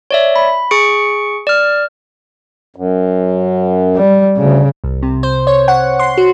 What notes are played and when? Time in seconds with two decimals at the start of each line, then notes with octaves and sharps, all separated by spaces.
0.11 C#5 D5 E5
0.36 B5
0.71 G#4 C#6 C#7 D7
1.47 D5 F6
2.76 F#2
3.96 G3
4.37 D2 C#3
4.84 C2
5.02 C3
5.23 C5
5.47 C#5
5.68 F#5
5.99 C6
6.17 F#4